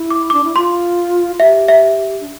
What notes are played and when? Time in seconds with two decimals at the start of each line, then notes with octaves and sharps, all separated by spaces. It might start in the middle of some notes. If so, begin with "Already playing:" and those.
Already playing: E4
0.11 D6
0.30 D4 D6
0.44 E4
0.55 F4 C6
1.40 G4 E5
1.68 E5
2.21 D4